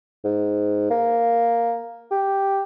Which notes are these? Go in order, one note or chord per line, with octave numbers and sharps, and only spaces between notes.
G#2
A#3
G4